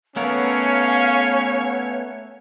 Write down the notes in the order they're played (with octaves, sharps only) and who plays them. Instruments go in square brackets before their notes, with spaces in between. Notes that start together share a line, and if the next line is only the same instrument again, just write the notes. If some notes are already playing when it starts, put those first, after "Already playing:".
[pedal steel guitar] A3 B3 A#4 [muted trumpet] C#4 [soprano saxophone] C#5 [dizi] F5